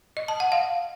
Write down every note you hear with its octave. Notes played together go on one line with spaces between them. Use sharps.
D#5
A5
F#5
F5